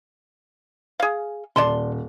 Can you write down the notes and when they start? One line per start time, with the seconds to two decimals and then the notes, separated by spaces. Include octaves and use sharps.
1.00 G#4 F5
1.56 D#1 D5 A5 C6